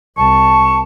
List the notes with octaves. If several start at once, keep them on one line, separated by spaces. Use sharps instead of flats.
C2 A5 C#6